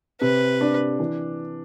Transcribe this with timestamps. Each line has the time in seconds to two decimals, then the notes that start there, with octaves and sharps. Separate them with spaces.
0.21 C3 B4
0.61 D4
1.00 E3